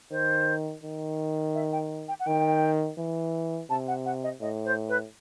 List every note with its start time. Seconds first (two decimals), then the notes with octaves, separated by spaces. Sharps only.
0.11 D#3 C5
0.83 D#3
1.54 E5
1.72 G5
2.08 G5
2.20 F#5
2.27 D#3 G5
2.98 E3
3.70 C3 A5
3.88 F#5
4.06 F#5
4.23 D#5
4.41 A2 D#5
4.65 C5
4.89 B4